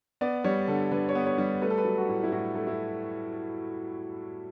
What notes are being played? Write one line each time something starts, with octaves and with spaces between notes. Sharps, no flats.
B3 D5
G3 C#5
D3 A4
D3 B4
C#5
B3
C#5
G3
A3 B4
A4
B4
F#3
F#4
A2
E4
A2 F#4
A3
E4